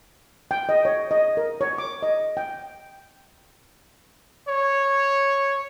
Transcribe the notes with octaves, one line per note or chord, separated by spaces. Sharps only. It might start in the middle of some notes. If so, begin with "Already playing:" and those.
G5
D#5
C#5
D#5
A#4
C#5
D6
D#5
G5
C#5